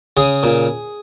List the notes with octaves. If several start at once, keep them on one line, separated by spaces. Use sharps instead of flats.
C#3 G#4
A#2